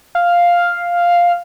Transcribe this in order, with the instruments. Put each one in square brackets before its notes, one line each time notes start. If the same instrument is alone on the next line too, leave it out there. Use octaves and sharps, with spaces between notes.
[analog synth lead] F5